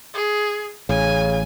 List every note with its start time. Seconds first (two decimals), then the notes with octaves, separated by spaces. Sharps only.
0.14 G#4
0.89 A1 C#3 G#5